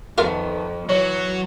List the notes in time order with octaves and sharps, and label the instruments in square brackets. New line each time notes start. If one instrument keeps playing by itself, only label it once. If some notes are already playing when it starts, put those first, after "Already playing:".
[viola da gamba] F2 [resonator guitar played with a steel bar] D#3 A3 B3 [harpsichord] F4 A#4
[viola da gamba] E3 F#4 [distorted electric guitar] F#3 [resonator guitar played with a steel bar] C#5